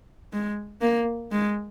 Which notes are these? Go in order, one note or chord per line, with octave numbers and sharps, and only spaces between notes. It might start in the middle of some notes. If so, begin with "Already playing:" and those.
G#3
A#3
G#3